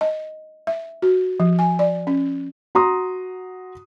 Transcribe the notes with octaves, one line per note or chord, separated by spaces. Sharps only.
D#5
E5
F#4
F3
G#5
D5
C#4
F#4 A#5 C6 D#6